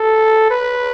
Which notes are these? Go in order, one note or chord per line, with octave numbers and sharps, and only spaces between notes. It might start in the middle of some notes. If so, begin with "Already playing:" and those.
Already playing: A4
B4